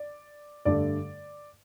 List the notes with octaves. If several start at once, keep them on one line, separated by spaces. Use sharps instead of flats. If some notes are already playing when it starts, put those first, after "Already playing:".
Already playing: D5
G2 D3 A3 D5